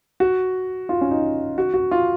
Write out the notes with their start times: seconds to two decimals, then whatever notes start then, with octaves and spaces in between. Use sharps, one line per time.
0.20 F#4
0.89 F4
1.01 C#4
1.11 D#4
1.58 F#4
1.74 F#4
1.91 F4